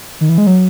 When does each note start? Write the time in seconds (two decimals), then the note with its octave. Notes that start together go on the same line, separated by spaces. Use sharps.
0.21 D#3
0.29 E3
0.38 G#3
0.47 F#3